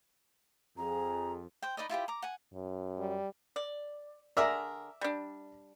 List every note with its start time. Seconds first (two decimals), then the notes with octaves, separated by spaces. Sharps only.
0.77 F2 G#4 A#5
1.62 C5 G5
1.77 D#4 B4 D5 D#5
1.90 E4 F4 G4 C5
2.08 A#5 D6
2.22 F#5 G#5
2.53 F#2
2.98 G3
3.56 D5
4.37 D3 G#4 A#4 D5 E5 A#5
5.01 G3 D4